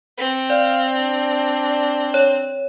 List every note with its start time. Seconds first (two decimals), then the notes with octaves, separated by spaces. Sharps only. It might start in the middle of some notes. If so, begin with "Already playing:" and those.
0.18 C4
0.50 D5 F5
0.94 D4
2.14 C#5